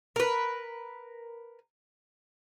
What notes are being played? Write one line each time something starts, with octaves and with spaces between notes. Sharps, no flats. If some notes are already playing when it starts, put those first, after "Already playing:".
A#4 B4